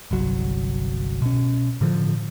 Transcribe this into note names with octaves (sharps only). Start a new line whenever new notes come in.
G1 C2 F#3
B2 C#4
A2 D3 F3